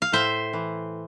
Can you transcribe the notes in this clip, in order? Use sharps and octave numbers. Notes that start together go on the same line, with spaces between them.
F5
A2 C5 E5
E3